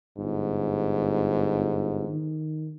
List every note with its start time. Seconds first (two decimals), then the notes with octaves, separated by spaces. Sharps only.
0.18 G1 G#2
2.08 D#3